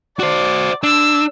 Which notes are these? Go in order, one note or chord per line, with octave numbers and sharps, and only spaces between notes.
F#4 C5 D5
D4 E6